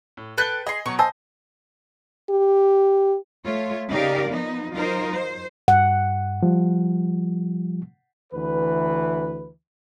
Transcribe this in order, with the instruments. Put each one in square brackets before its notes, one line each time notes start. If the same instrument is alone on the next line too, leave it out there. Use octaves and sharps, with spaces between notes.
[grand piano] A2
[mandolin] A4 G5 F#6 [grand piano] B4 B6 G7
[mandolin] G#4 C6 [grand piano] D#5
[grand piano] B2 F#3 [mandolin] C#6
[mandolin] C5 [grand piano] D#5 [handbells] G#5 A5 E6
[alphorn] G4
[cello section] A3 F4 C#5
C#3 D#4 G4 A#4 D5 F5
F3 B3 D#4
F#3 D#4 F4 A#4 C5
C5
[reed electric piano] G2 [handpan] F#5
[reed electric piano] F3 G3
[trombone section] D2 E3 B4